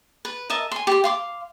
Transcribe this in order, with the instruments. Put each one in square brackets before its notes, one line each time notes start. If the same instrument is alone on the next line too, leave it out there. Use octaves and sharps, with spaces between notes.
[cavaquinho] B4
A#4 D#5 E5 A5
G#5 C6
G4 C6
F5 C6 D6